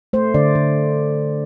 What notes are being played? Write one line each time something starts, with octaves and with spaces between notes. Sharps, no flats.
A3 C5
D3 D5
D3